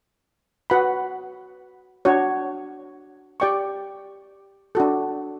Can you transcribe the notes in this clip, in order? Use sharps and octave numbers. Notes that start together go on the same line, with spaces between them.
F#4 B4 F#5 B5
D4 F#4 C#5
G4 D5 G5 C#6
D4 F#4 A4